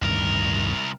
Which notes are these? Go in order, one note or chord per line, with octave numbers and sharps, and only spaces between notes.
D1 C2 G2 D#3 A#4